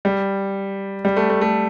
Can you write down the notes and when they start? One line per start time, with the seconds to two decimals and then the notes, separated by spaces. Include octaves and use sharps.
0.05 G3
1.05 G3
1.17 A3
1.30 A3
1.41 A3